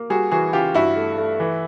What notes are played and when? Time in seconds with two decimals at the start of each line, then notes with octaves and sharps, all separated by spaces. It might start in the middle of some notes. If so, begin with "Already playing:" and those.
Already playing: A#3
0.10 G3 F#4 G#4
0.31 E3 F#4 G#4
0.53 C#3 F4 G4
0.74 G2 E4 F#4
0.96 A3
1.18 A3
1.40 E3